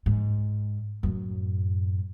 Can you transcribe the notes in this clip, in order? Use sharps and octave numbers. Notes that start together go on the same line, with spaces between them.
G#2
F#2 A2